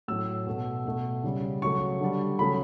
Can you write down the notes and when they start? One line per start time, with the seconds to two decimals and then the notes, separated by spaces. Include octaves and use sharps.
0.08 A2 F#3 A3 E6
0.46 B2 A3
0.85 B2 A3
1.24 C#3 G3
1.62 C#3 F#3 A3 C#6
2.01 D3 G3
2.39 C#3 F#3 A3 B5